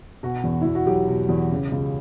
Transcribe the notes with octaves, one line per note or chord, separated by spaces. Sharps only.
B2 F#4
E2
E2 E4
F#4
F#3 G4
B2
E2
C#3
C#2